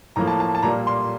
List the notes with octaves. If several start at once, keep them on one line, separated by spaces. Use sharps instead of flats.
A2 F3 A#3 A#5
A5
A5
A5
A#2 G3 A#3 A#5
C6